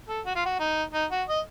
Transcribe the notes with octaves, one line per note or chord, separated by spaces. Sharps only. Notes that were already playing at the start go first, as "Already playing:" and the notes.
A4
F#4
F4
F#4
D#4
D#4
F#4
D#5